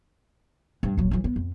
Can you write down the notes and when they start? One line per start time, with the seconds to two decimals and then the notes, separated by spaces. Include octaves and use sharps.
0.83 G2
0.97 D#1 F#3
1.11 E3 F#3
1.24 B3
1.36 F2